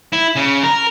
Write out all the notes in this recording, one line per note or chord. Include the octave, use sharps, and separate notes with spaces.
E4
C#3
A#4